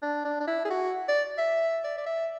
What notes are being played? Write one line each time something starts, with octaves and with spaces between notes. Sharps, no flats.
D4
D4
D4
E4
G#4
F#4
D5
E5
D5
D5
E5